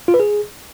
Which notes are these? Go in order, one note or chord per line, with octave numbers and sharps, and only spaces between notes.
F4
B4
G#4